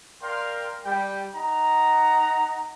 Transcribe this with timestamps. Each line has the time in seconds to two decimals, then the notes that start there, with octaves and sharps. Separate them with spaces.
0.22 A#4 D5 F5 G5 C6
0.85 G3 G5
1.34 D#4 F#5 A#5